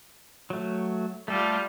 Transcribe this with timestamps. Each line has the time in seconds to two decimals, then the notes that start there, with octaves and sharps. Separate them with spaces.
0.50 F#3 A3
1.28 G3 A3 F4 A4